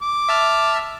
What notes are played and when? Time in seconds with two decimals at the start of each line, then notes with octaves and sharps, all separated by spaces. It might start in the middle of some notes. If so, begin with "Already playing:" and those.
0.01 D6
0.29 E5 A5 F6